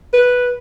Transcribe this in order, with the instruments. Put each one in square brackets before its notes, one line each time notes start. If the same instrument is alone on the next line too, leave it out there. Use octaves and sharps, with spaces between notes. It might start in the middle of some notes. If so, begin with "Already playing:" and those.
[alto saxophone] B4